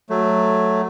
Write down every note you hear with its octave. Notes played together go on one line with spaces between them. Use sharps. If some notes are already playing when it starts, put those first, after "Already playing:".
F#3 A3